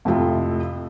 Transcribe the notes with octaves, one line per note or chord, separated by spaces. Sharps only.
F2 A2 C3 A3 F4